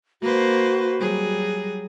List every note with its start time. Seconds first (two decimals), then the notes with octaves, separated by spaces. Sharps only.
0.22 A#3 F#4 B4 C5
1.00 F#3 G3 G#4